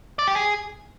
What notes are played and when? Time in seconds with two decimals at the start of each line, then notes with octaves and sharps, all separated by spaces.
0.19 D5
0.27 G4
0.36 G#4